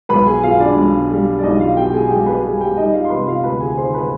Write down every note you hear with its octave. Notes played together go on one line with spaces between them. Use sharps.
B1 B4 B5
G#4 G#5
B2 F4 F5
D4 D5
B1
G3
D5
B1 D#4 D#5
F4 F5
B2 G4 G5
G#4 G#5
B1 G4 G5
B4 B5
G3 G#4 G#5
G4 G5
G3 D#4 D#5
F4 F5
C6
C3 B4 B5
F4 F5
D2 B4 B5
G#4 G#5
D#3 C5 C6
B4 B5